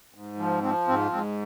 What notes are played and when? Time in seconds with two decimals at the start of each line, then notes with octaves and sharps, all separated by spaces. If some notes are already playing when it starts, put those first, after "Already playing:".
0.14 G#2
0.39 F3
0.63 F3 C4
0.88 G#2 C4
1.12 G#2 C4